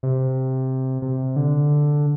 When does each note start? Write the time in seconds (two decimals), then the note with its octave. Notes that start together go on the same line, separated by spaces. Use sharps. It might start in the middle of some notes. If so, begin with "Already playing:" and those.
0.03 C3
1.02 C3
1.36 D3